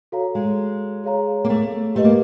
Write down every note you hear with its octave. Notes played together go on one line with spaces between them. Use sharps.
F#4 A4 C#5 F5 A#5
G#3
G#4 C#5 F5 A#5
A#3
A3
A3 G4 B4 D#5
A#3